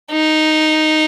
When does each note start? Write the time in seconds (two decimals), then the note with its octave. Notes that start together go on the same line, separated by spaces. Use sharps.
0.12 D#4